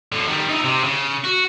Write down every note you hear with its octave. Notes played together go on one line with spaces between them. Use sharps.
A2 D3
D#3 G3
D#4 E4
C3
C#3
F#4